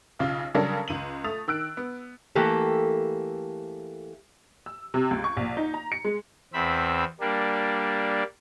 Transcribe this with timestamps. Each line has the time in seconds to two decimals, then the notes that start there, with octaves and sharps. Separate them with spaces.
0.19 B1 C#3 F4
0.55 C#3 F#3 G3 D4 A4 A#4
0.88 C#2 D#7 F#7
1.24 A3 D#6 A6 F7
1.48 D#3 E6 F#6 D7
1.77 B3
2.35 E3 A3 A#3 G4 A4
4.66 E6
4.94 C3
5.11 C#2
5.24 C#6
5.37 A#1
5.57 D#4
5.74 A#5
5.92 C#7
6.05 G#3
6.53 E2 C4 E5 B5
7.20 G3 A#3 D4